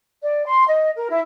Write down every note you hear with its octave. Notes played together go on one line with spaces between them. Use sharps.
D5
C6
D#5
A#4
E4